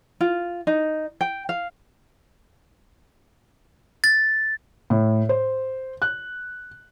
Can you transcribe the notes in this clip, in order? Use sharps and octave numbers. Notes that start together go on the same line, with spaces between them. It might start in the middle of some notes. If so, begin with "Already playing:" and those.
F4
D#4
G5
F5
A6
A2
C5
F#6